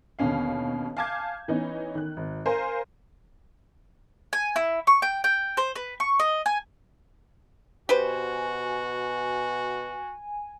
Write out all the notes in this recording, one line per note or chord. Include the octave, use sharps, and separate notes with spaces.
D#2 B2 D3 C#4 F5
F5 G#5 A5 D6 G6 G#6
E3 B3 C#4 D#4
D#3 F#6
G#1
A#4 C5 F5 G#5 A#5
G#5
E4
C#6
G5
G5
C5
B4
C#6
D#5
G#5
B2 F#4 G4 B4 C5 G#5